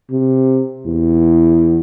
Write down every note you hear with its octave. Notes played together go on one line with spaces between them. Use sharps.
C3
E2